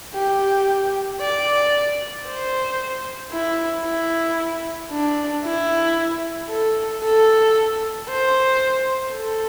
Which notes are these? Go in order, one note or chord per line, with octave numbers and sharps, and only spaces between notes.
G4
D5
C5
E4
E4
D4
E4
A4
A4
C5
A4